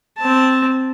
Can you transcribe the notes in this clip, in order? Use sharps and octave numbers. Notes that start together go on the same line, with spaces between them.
C4 A5